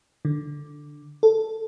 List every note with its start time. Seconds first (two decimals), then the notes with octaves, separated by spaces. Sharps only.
0.25 D3
1.23 A4